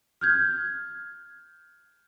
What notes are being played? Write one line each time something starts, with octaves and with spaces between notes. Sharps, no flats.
F6 G6 G#6